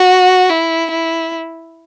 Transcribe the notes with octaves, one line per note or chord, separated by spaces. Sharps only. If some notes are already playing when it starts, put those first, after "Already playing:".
Already playing: F#4
E4
E4